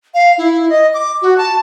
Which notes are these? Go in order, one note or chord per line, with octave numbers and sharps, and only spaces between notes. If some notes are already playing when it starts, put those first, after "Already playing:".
F5
E4
D#5
D6
F#4
A5